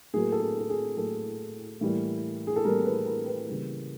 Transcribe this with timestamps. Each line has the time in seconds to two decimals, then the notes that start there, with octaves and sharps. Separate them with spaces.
0.14 A2 F#3 A#3 G#4
0.32 A4
0.42 G#4
0.59 A4
0.70 G#4
0.97 A2 F#3 A#3 A4
1.81 A2 E3 G3 A#3
2.47 G#4
2.56 A4
2.64 A2 E3 G3 A#3 A#4
2.85 B4
3.06 A#4
3.27 B4
3.48 C#3 E3 G3 A#3